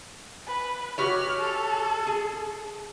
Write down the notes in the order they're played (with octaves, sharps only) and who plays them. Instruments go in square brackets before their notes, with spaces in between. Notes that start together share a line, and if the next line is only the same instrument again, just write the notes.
[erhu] B4
[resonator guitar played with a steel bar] F#4 G4 C#5 [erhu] F6
[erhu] A4
[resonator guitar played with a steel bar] G#4